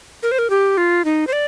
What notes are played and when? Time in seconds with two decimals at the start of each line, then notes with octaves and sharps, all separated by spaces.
0.23 A#4
0.32 C5
0.39 A#4
0.50 G4
0.77 F4
1.05 D#4
1.27 C5
1.33 D5